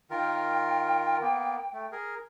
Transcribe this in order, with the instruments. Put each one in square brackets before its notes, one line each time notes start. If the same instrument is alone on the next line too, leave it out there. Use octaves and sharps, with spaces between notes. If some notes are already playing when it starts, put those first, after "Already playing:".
[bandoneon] D#3 F4 A#4 [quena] G5
[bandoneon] A#3 B3
A3
G#4 A#4